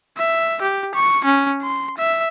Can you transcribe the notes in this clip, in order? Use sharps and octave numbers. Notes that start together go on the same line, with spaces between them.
E5
G4
C#6
C#4
C6
E5